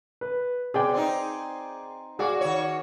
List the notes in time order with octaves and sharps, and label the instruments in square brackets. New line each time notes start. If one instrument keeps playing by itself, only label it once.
[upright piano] B4
[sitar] B2 [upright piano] G#4 D5 G5
[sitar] C4 D#4
[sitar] F#4 [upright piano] G#4 D5 F5
[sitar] D#3 F#4 C#5